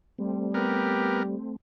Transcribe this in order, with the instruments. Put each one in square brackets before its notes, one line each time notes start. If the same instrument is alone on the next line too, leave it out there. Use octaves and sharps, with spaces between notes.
[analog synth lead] G3 [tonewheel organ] A3 C4
[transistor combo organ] B3 A#4 [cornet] G4